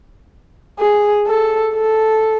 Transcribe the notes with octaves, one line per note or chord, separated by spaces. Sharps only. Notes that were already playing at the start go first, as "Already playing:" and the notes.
G#4
A4
A4